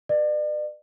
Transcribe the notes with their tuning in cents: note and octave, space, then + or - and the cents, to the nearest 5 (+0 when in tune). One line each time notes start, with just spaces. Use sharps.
B4 +0 D5 +40